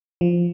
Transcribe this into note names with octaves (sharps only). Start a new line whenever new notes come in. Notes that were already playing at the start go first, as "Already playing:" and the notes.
F3